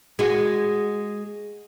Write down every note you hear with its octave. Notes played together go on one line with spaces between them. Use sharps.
G#3 F#4